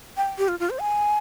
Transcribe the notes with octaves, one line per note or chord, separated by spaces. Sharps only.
G5
G4
F4
F4
C5
G#5